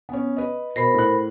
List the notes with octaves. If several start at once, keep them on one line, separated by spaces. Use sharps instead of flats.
B3 C#4
B4 D#5
B2 A#4 C5 B5
A2 F#6